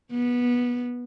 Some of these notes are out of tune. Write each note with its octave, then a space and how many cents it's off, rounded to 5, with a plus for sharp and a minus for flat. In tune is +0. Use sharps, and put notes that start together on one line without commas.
B3 -15